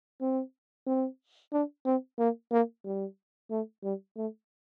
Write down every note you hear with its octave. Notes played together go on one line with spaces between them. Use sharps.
C4
C4
D4
C4
A#3
A#3
G3
A3
G3
A3